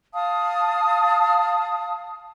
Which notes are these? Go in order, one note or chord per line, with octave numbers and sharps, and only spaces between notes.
F5 A5 D#6